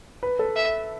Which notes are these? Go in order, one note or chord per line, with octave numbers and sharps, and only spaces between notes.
B4
A4
E5